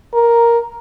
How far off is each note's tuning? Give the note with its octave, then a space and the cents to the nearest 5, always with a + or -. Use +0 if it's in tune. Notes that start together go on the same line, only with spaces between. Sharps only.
A#4 +5